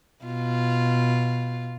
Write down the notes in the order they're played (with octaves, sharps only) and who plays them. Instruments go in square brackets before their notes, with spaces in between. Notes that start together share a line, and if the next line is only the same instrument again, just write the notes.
[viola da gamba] B2 F4